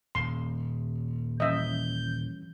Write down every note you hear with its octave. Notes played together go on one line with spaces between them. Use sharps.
D#1 C6
E3 G3 C#4 D#5 E5 G6